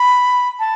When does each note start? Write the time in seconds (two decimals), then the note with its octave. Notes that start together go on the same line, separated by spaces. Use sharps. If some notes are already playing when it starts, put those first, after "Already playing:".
Already playing: B5
0.59 A5